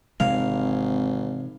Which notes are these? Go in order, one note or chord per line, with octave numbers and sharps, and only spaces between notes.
G#1 C3 E3 G#3 F5